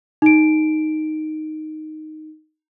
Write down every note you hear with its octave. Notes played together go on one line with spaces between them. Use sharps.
D#4 D7